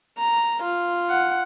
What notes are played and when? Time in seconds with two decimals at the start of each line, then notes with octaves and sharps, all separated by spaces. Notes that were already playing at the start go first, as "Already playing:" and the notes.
0.18 A#5
0.62 F4
1.10 F#5